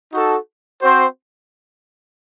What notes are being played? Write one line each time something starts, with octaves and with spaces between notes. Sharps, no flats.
D#4 F#4 A4
C4 F#4 C5